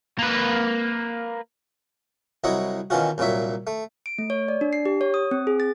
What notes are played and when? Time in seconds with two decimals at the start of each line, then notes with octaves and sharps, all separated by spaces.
0.19 A#3 B4
2.44 C2 F#3 E4 C#5 D#5 F#5
2.90 B2 D#3 E3 C#4 F4 F#4
3.18 C2 A#2 F#3 C#5 E5
3.67 A3
4.06 D7
4.18 A3
4.30 C#5
4.48 D5
4.61 D4
4.73 C7
4.85 G4
5.01 C#5
5.14 D#6
5.31 C4
5.47 G#4
5.60 A6